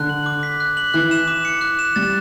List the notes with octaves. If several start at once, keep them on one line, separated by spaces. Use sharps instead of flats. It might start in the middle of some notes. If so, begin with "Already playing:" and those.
Already playing: D3 F#6
F#7
D6
B6
F#6
F#7
E3 F#6
E7
D6
C#7
F#6
E7
G3 A6